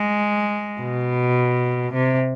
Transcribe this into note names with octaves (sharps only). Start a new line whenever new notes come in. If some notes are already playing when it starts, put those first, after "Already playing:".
Already playing: G#3
B2
C3